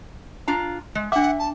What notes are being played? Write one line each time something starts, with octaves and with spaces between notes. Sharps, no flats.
D4 F4 A#5
G#3
D4 E5 F#5 D6
A5